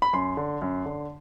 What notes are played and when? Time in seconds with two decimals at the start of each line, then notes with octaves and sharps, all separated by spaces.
0.02 B5
0.13 F#2 C6
0.37 D3
0.62 F#2
0.85 D3